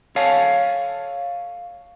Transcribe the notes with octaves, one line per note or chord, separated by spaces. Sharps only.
A4 C#5 F5 G#5 A5